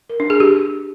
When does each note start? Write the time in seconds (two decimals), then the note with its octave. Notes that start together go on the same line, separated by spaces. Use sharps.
0.10 A#4
0.20 D4
0.30 G#4
0.40 G4